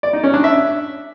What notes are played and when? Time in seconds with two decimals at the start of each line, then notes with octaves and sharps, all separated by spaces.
0.03 D5
0.13 D#4
0.23 C#4
0.34 D4
0.44 E5